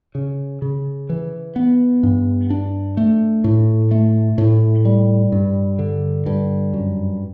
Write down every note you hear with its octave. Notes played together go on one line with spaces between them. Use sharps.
C#3
C#3
E3
B3
G2
D4
A3
A2
A3
A2
G3
G2
D3
G2
F#2